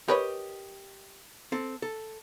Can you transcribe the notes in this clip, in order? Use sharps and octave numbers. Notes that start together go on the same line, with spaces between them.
G4 A#4 B4 C#5 D#5
C4 A4
A4